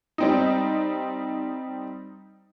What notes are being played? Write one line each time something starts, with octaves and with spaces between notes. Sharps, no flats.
G3 C4 D#4